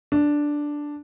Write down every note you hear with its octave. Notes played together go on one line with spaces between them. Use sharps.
D4